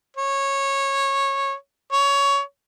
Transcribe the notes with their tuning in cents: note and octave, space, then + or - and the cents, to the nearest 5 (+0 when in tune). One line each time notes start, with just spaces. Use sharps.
C#5 -15
C#5 +15